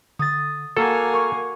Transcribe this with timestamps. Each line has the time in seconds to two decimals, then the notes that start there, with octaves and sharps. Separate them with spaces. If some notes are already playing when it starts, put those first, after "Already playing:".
0.19 D3 D#6 A6
0.77 A#3 F#4 A4 F#5 G#5
1.14 A#4 C#6